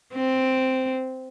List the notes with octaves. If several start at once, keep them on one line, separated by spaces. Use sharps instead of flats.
C4